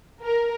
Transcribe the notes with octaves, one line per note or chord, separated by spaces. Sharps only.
A#4